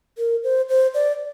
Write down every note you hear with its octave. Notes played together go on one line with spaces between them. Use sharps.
A#4
C5
C5
D5